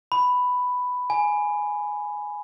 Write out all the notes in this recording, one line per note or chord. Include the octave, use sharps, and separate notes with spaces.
B5
G#5